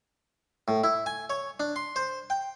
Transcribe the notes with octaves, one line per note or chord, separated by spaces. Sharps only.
A2
E4
G#5
C#5
D4
C6
C5
G5